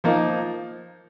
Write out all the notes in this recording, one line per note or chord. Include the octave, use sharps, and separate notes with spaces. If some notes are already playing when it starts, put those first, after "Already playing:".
F3 A#3 D#4